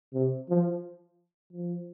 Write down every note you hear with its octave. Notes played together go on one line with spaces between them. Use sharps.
C3
F3
F3